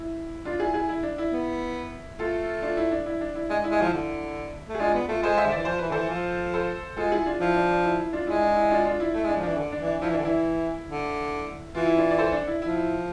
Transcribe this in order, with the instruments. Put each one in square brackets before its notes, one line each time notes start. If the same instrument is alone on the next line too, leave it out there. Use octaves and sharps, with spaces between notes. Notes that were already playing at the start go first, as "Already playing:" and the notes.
Already playing: [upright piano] E4
D4 F4
E4 G#4
E4 G#4
E4
D4
E4
[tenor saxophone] B3
[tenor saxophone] A3 [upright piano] F4 A4
[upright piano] D4 F4
E4
D4
E4
D4
E4
[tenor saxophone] G#3 [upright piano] D4
[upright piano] E4
[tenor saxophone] G#3
[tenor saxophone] F3 [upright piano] E4
[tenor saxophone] D3
A3
[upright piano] G#4
[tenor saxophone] G#3 [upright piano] D4 F4
[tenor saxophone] B3
[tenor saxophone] A3 [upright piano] F4 A4
[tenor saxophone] G#3 [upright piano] A4 C5
[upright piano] C5 E5
[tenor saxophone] D3
[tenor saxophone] E3 [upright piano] D5
[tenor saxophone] F3 [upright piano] C5
[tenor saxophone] E3 [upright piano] B4
[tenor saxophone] D3 E3 [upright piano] A4 C5
[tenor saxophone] F3
[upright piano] A4 C5
[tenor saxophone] G#3 [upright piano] F4 A4
[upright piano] E4 G#4
D4 F4
[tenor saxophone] F3 [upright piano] E4
[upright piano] D4
D4
E4
E4
D4 F4
[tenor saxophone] G#3 [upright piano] E4
[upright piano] D4
E4
D4 F4
D4 F4
E4
[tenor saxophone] A3 [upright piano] E4
[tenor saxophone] G#3
[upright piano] D4
[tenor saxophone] F3
[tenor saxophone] E3 [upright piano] D4
[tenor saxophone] D3
[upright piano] D4
[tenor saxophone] E3
[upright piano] D4
[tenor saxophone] F3 [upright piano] E4
[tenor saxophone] E3
[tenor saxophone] D3 [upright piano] D4
[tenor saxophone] E3 [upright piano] E4
[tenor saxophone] D3
[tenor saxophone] E3 [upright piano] F4
[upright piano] E4
D4 F4
D5
A4 C5
D4
E4
[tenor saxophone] F3 [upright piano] E4
[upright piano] E4